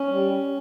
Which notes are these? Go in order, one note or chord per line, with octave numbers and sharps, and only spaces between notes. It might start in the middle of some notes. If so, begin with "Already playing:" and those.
Already playing: C#4
G3